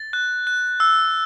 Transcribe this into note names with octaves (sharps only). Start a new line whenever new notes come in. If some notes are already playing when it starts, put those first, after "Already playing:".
Already playing: A6
F#6
F#6
E6